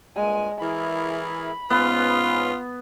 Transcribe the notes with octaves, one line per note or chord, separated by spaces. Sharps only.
G2 A#2 G#3 G#5
E3 E4 G#4 A#4 B5
G#2 B3 C#4 F4 B4